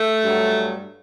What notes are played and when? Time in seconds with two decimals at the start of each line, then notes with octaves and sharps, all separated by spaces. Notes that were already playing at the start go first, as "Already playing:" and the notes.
Already playing: A3
0.22 G2 F#3